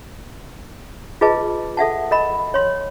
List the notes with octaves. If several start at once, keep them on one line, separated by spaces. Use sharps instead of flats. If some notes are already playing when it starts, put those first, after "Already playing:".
F4 G#4 B4 D#5 A5
A4 E5 F#5 A5
A#4 D#5 B5
C#5 C6